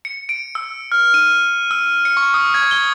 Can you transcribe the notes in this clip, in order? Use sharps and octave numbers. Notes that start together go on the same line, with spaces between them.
C#7
D7
E6
F6
D#7
E6
C#7
C#6
D#6
G#6
G7